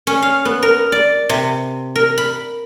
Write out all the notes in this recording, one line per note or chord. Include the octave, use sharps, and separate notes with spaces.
C#4
F5
B3
A#4
D5
C3
A#4
B5